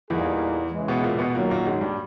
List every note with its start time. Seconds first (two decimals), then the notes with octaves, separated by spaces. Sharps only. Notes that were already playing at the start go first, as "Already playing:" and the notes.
0.10 E2 A#2 E3 G3 A#3 D#4 G#4
0.73 C#3 E3 G#3
0.88 B2 B3
1.03 A#2 A#3
1.19 B2 B3
1.35 F#2 A#2 D#3 F#3 A#3
1.50 A#2 A#3
1.67 G#2 G#3
1.81 G2 G3